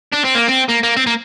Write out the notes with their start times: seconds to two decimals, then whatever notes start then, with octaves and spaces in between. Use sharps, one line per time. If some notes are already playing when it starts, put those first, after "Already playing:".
0.13 D4
0.25 C4
0.36 A#3
0.48 C4
0.69 A#3
0.83 A#3
0.97 C4
1.07 A#3